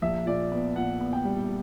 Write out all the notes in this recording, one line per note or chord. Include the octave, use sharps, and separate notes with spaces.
A#1 E5
A#2 D5
B3 D5
A#2 F#5
B3
G5
G3